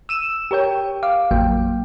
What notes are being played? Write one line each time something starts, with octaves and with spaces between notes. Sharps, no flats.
E6 D#7 E7
G4 A#4 C#5 G5
F5 D6
A1 F2 F#3 A#3 G5